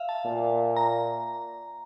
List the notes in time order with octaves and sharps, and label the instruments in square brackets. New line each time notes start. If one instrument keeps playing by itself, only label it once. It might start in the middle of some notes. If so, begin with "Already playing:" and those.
Already playing: [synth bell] E5 F5
A5
[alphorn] A#2
[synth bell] A#5